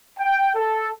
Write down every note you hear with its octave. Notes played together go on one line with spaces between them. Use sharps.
G5
A4